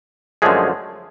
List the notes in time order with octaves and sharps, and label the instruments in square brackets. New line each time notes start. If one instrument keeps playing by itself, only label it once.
[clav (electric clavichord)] F#2 D3 F3 G#3 A3 G#4